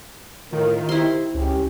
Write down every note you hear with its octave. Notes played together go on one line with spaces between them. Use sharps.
A2 D#3 F4 A#4
E4 G4 C5 C6
C#2 C#4 G4